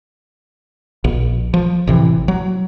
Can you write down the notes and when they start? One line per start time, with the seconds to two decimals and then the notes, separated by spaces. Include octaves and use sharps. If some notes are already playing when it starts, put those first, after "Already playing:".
1.04 A#1
1.54 F3
1.87 A1 C3 E3
2.28 F#3